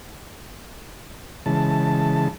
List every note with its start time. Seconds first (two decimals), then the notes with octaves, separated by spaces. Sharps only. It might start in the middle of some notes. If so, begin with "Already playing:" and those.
1.46 C#3 E3 G#3 A5